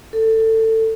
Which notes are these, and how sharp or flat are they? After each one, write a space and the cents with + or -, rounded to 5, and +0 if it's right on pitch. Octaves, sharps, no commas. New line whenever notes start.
A4 +20